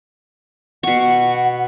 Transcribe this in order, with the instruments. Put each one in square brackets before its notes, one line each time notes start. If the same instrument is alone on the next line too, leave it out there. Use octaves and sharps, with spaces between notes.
[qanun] B2 C#6 [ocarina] F#5